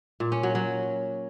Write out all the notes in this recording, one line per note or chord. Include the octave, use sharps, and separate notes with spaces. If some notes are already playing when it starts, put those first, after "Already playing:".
A#2
C#4
F#3
F#3